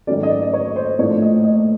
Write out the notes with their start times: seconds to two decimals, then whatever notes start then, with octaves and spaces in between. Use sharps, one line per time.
0.07 G#2 D#3 F#3 A3 C#4 D5
0.23 D#5
0.29 D5
0.42 D5
0.53 C#5
0.76 C5
0.99 A2 F3 A#3 D4 C#5
1.22 D#5
1.44 D#5